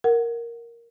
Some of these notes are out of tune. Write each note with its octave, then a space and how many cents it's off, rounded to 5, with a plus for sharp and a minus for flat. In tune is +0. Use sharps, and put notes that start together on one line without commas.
A#4 +0 F#5 +0